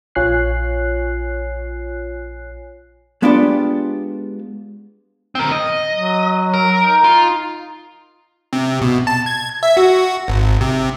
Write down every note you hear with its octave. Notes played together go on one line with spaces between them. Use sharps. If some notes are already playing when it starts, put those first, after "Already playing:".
A#1 F4 C#5 G#5 F#6 C7
G#3 B3 D4 F4 G4 D5
C4 A#4
D#5
F#3
A#4
D#4
F4
C3
B2
A5
G#6
E5
F#4
G#1
C3